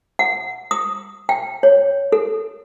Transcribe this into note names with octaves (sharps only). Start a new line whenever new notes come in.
F#5
D#6
G5
C#5
A4